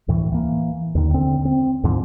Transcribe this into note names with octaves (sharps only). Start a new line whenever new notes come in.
D2 A2 E3
E3 A#3
D#2 D3 D#3
D3 C4
C4
D2 G#2 D3 F3